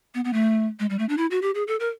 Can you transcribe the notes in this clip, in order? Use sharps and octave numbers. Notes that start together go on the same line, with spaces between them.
B3
B3
A3
G#3
G3
A3
D4
E4
F#4
G4
G#4
A4
A#4